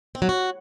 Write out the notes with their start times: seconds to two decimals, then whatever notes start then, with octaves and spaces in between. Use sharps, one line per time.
0.15 C4
0.22 F#3
0.29 F#4